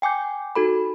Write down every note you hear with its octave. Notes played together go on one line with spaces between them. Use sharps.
G5 G#5 D6 G6
D#4 F#4 A4 B5